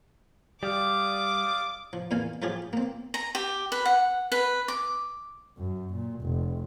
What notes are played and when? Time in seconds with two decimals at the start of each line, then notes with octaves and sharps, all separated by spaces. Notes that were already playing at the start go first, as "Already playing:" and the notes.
0.63 G3 D5 F5 D6 D#6
1.93 F3
2.11 E2 A#2 F5 G#5
2.42 F3 F#3 F4 G4 G#4
2.73 A#3 C4
3.14 A#5
3.35 G4
3.72 B4
3.86 F#5
4.32 B4
4.68 D6
5.58 F#2
5.93 A#2
6.22 F1